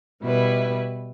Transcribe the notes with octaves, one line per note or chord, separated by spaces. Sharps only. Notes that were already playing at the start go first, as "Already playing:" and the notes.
B2 G3 E4 B4